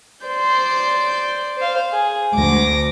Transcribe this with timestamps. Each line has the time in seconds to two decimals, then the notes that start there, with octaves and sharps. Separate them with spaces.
0.26 C5 D5 G6
1.56 C5 F5
1.92 G#4
2.34 D2 D6 A#6